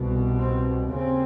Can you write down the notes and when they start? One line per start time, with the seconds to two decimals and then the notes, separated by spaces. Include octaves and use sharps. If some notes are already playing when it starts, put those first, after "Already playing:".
Already playing: C2 B2
0.39 C4
0.89 D#2 C#3 C4